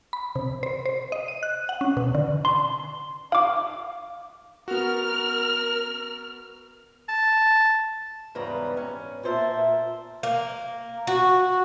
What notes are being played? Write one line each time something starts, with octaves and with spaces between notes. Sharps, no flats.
B5
C3
C5
C5
D#5
D#7
F#6
F#5
C#4
B2
D3
C6
F5 D6
B3 F#4 A#4 F6
A5
E2 G#2 C#3 G3 B4 A#5
C#4
A#2 A#4 C5 D5 E5 A5
A#3
F#4